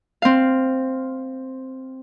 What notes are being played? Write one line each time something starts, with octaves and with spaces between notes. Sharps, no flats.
C4 F5